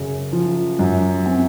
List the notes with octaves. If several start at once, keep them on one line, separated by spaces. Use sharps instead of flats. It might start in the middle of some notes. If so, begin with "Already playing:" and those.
Already playing: F#2 C#3
F3
F#2
C4